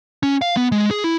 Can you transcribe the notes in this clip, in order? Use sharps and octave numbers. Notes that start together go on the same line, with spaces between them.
C#4
F5
B3
G#3
G#4
E4